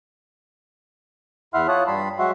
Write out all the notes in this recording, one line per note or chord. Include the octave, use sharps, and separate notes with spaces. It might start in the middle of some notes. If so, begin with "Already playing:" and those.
E2 E4 E5 F#5 C6 F6
F4 C#5 A5 D#6 F#6
G2 G3 A5 B5 C6
F#3 G#3 F#4 E5 F#5 C6